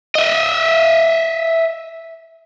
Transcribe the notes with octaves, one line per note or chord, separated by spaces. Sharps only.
D#5 E5